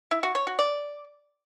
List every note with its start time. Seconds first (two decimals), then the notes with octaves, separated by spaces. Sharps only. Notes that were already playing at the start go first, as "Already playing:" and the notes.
0.11 E4
0.23 F#4
0.35 C#5
0.47 F#4
0.59 D5